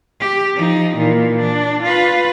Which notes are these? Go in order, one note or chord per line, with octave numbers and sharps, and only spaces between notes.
G4
F3 D#4
A#2 E3
D4
F4 B4